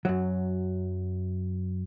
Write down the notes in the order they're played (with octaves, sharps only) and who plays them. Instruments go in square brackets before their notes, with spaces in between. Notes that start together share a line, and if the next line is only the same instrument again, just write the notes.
[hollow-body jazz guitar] F#2 F#3